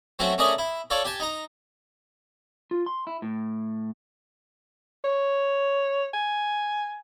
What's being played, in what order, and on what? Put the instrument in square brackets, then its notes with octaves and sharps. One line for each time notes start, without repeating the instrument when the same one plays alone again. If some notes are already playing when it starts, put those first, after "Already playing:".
[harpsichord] F#3 A3 C4 C#4 F#4
A3 C#4 G#4 A#4 D5 D#5
E4
F4 A4 C#5 D5
G4 G#5 A5
D#4 A#5
[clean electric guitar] F4
C6
E4
A2
[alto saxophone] C#5
G#5